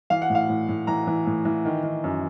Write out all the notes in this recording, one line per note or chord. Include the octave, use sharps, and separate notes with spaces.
E3 F5
F#5
A2
F5
A2
A2
E3 A#5
E3
A2
E3
D#3
D#3
F#2